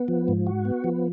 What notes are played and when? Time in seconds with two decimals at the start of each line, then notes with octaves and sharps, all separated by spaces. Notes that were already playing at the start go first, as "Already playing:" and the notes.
Already playing: B3
0.08 F3
0.28 G#2
0.47 F#4
0.65 B3
0.84 F3